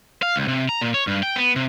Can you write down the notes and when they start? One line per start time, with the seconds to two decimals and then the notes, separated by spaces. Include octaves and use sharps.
0.23 F5
0.36 C#2
0.48 C3
0.69 A#5
0.81 A#2
0.94 C#5
1.07 G2
1.23 G5
1.36 B3
1.56 C3